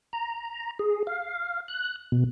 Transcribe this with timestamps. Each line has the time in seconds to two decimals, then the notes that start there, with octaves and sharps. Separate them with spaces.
0.13 A#5
0.79 G#4
1.07 F5
1.68 F#6
2.12 B2